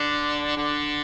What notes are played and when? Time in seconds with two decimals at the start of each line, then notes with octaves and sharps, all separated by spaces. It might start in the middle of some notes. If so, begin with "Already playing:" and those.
Already playing: D3 D4
0.57 D3 D4